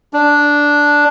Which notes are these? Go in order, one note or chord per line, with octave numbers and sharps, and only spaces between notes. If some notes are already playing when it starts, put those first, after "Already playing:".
D4